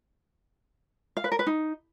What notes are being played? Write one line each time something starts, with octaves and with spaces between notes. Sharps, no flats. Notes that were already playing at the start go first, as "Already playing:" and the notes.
F5
B4
A#4
B4
D#4